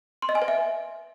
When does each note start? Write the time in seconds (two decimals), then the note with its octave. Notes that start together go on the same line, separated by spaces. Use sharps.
0.22 C6
0.29 D#5
0.35 G#5
0.42 B4
0.48 E5